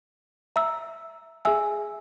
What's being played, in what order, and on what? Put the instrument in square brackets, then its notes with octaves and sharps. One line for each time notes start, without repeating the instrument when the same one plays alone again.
[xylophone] E5 A#5 E6
G#4 E5 G#5 E6